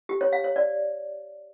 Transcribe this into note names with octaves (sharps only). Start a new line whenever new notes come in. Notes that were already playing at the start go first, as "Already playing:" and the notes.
G4
C#5
F5
C#5
D5